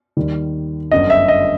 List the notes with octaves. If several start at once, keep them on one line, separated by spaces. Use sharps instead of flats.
D#2 D#3 G3
G1 F#2 D3 D#5
E5
D#5